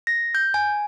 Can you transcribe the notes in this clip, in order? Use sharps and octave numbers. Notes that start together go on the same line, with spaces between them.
A#6
G6
G#5